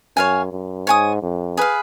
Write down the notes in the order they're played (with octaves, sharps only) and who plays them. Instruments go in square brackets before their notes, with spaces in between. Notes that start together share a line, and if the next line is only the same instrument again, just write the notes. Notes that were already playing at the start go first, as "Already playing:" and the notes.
[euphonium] F#2 [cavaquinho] C#5 F5 G#5
[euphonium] F#2
[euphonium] G#2 [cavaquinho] C#5 G#5 D#6
[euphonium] F2
[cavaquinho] G#4 B4 F5